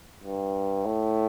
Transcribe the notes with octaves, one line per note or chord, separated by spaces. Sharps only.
G2
A2